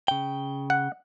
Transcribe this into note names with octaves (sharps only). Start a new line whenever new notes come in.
C#3 G5
F#5